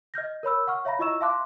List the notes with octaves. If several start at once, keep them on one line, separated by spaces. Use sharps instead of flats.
D#5 F6 G6 A#6
A#4 C#5 B5 E6
F#5 C#6 F6
C#5 E5 F5 A#5 B5 A#6
E4 F4 D#5 C#6 E6 E7
E5 F5 A5 C6 D6 F#6